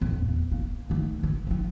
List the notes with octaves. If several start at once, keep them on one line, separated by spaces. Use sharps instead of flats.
F2
E2
A#3
D2 D#3
D3
F3 F4